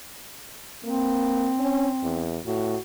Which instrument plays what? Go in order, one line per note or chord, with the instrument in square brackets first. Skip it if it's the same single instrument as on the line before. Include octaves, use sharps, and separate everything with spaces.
[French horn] A#3 [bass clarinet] C4
[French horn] C#4
E2
[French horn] A2 [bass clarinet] F#4